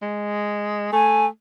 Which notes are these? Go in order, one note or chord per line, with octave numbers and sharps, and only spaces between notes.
G#3
A3 G#5